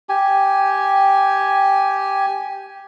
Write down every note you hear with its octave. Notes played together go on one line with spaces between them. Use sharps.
G4 G#5